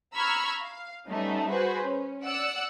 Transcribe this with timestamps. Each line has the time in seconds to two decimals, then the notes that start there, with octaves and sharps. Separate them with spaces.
0.15 A#5 B5 C#6 E6 F6 G#6
0.61 F5
1.08 G3 A3 B3 C#4 D#4
1.49 F#4 G#4 B4 C5
1.84 C#4
2.24 D5 F#5 E6 F#6